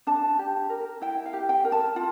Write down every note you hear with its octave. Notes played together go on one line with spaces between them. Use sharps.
D4 A5
G4
A#4
E4 G5
F5
G4
G5
A#4
A5
F4